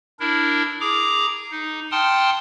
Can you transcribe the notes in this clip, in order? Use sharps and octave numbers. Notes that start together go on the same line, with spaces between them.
D4 E4 A#4
G#4 A#5 D6
D#4
F#5 G5 A5 C6 D#6 F6